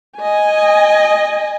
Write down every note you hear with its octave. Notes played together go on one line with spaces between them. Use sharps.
D#5 G#5